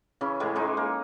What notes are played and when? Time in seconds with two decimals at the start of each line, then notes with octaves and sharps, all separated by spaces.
0.21 C#3 E3 C#4
0.40 A2 E3 G#3 G#4
0.55 E3 G#3 D#4
0.77 A#3